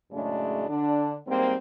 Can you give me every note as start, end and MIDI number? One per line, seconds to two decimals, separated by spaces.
0.11 0.65 42
0.11 0.65 45
0.11 0.65 49
0.11 0.65 56
0.11 0.65 57
0.11 0.65 62
0.67 1.15 50
0.67 1.15 62
1.26 1.54 44
1.26 1.54 55
1.26 1.54 58
1.26 1.54 60